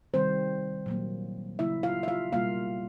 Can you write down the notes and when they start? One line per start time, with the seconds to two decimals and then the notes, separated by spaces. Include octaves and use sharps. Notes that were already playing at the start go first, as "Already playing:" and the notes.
0.14 C3 D#3 G3 C4 C5
0.86 A#2 F#3 A#3
1.59 C#3 F#3 A#3 E4 E5
1.83 F4 F5
2.03 E5
2.08 F4 F5
2.32 B2 G3 A#3 F4 F5